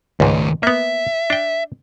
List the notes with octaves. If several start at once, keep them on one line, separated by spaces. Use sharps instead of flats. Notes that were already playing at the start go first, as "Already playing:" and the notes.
C#2 G#2 D#3 A3
A#3 B3 E5
D4 G5